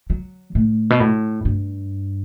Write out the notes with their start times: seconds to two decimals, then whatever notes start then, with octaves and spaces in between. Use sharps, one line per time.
0.10 F#3
0.55 A2
0.90 B2
1.00 A2
1.45 G2